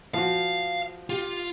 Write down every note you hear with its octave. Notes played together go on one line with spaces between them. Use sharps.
F3 F#4 F5
F4 G4